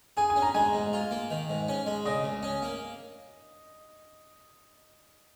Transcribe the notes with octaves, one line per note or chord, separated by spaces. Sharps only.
G#4 G#5
G#5
C#4
A#5
G#3 G#5
G#2
F4
A#3
D#3
G#2
C#4
G#3
C#3 D#5
C#2
C#4
A#3